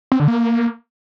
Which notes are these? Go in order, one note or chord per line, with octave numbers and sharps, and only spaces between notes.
C4
D3
A#3